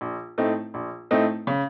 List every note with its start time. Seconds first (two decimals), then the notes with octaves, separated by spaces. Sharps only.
0.01 A#1
0.38 A2 A3 C4 D#4
0.74 A#1
1.11 A2 A3 C4 D#4
1.47 C#3